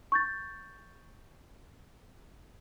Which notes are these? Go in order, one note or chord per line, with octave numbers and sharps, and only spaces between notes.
C#6 G6 A6